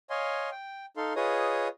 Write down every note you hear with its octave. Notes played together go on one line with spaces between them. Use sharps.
C#5 D#5 F5 G#5 C6
G5
D#4 A4 F5 C6
F4 G#4 B4 C#5 D#5 D#6